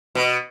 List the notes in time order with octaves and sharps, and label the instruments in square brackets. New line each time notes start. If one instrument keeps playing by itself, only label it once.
[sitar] B2